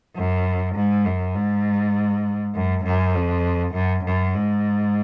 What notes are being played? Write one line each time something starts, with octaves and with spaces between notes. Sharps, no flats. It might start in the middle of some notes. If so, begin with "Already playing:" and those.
F#2
G#2
F#2
G#2
F#2
F#2
F2
F#2
F#2
G#2